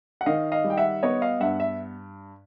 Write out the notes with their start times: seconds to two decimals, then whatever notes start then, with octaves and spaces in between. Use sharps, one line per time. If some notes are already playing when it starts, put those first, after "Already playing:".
0.21 F#5
0.26 D#3 D#5 F5
0.52 D#5 F5
0.64 G3
0.70 G5
0.77 E5 F#5
1.03 B3 C#5 D#5
1.22 D#5 F5
1.40 G2 E5 F#5
1.60 E5